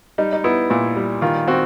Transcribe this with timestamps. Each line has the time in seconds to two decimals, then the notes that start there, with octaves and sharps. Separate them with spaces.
0.18 G3 D#4
0.33 D#4
0.44 B3 E4
0.70 A#2 E4
0.96 G3
1.22 D#3 F4
1.48 C4 F#4